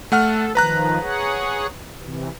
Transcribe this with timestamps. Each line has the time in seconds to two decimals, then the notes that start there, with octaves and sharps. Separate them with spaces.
0.12 A3 A4 F#5 F6
0.55 D#3 F3 B4 A#5 F#6
1.01 G#4 C#5 F#5
2.00 C3 E3